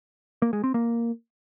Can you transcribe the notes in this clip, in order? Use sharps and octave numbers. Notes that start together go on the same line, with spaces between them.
A#3
G#3
C4
A#3